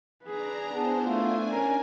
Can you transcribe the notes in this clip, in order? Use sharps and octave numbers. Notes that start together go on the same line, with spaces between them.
D4 G#4 B4 A#5
B3 D4 E4 G#4 C5
A3 D4 F4 G#5
C#4 A#4